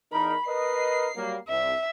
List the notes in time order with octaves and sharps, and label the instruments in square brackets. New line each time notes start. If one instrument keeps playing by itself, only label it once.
[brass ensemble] E2 D#4 A#4 [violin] B5
[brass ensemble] A#4 B4 D#5 [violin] C7
[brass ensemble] F#3 G3 A#3
[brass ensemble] C2 [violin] E5